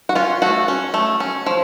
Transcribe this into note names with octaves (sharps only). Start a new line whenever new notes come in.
F#4
C#4 F4
A3 F#4
C#4
A3
C#4
F3